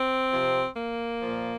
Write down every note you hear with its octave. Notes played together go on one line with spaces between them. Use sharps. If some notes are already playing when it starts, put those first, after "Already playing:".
Already playing: C4
C3 F3
A#3
A#2 F3